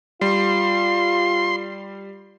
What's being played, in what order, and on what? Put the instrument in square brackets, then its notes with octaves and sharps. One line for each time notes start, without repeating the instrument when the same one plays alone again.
[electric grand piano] G3 [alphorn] F4 [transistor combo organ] C6